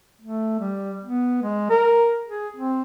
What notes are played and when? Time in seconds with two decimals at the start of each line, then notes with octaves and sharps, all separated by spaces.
0.21 A3
0.60 G3
1.03 B3
1.42 G#3
1.70 A#4
2.27 G#4
2.56 C4